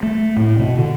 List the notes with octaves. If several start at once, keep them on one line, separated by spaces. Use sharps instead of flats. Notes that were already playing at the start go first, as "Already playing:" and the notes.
A3
A2
B2
D3